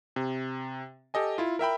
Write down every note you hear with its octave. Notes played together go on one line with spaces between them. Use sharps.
C3
G4 A4 D#5 G#5
E4 F4
A#4 E5 G5 B5